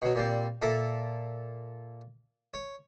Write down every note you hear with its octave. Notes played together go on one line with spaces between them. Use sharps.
B2 F#3
A#2 G3 C4
A#2 A4 E5 A#5 D6
C#5